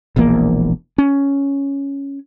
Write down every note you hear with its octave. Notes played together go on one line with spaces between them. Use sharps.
E1 A#1 E2 A#3
C#4